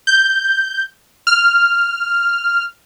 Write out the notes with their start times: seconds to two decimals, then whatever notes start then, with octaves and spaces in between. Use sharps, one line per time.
0.07 G6
1.27 F6